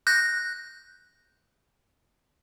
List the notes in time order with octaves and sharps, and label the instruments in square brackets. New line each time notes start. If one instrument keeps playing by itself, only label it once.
[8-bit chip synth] F#6 G6 A#6